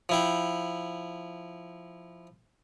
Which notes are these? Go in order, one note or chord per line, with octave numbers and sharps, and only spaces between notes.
F3 E4 G5